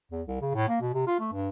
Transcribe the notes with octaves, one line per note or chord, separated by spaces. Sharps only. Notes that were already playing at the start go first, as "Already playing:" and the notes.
E2
C2
C#3
A2
A#3
B2
C3
F4
A3
G2